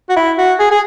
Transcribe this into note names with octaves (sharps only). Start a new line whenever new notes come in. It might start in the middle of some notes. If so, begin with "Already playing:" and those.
F#4
E4
F#4
G#4
G#4